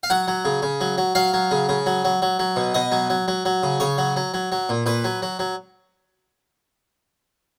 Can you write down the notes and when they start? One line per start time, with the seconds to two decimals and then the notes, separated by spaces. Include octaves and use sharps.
0.03 F5
0.10 F#3 F#5
0.28 F#3
0.45 C#3
0.62 C#3
0.81 F#3
0.98 F#3
1.15 F#3 F5
1.34 F#3
1.51 C#3
1.69 C#3
1.86 F#3
2.04 F#3
2.22 F#3
2.39 F#3
2.56 B2
2.74 B2 D#5
2.92 F#3
3.10 F#3
3.28 F#3
3.45 F#3
3.63 C#3
3.80 C#3 C#5
3.98 F#3
4.16 F#3
4.34 F#3
4.52 F#3
4.69 A#2
4.86 A#2 B4
5.04 F#3
5.22 F#3
5.39 F#3